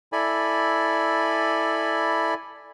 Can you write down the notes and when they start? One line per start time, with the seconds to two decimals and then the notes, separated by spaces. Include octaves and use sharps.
0.13 E4 A4 D5 G#5 B5